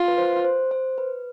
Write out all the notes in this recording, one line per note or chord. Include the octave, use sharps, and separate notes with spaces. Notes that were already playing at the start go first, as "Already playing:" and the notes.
Already playing: F4
B4
C5
C5
C5
B4